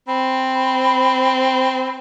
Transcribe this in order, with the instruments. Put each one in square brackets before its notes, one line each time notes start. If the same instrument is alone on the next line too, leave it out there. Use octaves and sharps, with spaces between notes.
[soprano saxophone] C4 [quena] B5